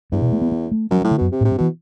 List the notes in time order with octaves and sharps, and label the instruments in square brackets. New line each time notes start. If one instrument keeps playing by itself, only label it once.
[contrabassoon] E2 [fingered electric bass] G2
[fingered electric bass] B2
A3
B3
B3
A3
[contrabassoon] F#2 [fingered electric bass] F#3
[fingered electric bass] F#3
[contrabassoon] A2
[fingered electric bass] D3
[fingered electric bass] F#2 [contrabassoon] B2
[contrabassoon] C3
[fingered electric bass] A2
[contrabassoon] C3
[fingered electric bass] G2
[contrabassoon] B2 [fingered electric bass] E3